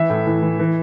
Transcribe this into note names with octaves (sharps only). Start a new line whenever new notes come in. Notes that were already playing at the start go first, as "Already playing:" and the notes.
Already playing: E3 E5
A2
E3
E3
E3